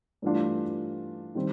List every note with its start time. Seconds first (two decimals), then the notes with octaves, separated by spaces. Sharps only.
0.22 G2 E3 A3 D4 F4
1.35 D#3 G3 C4